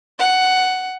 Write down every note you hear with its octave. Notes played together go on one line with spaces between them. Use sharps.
F#5